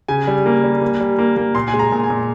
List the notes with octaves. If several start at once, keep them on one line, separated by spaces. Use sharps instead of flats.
C#3 G#5
G3
A#3
G3
A#3
G3
A#3
A#3
A#2 C6
G#5
G#3
A#5
A#2
G#5
A#2